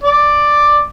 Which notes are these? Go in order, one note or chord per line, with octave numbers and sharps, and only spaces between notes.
D5